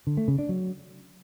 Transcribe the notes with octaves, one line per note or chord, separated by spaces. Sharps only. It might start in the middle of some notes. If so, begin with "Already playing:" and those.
D3
A3
C#3
D4
F#3